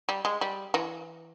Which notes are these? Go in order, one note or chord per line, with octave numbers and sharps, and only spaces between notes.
G3
G#3
G3
E3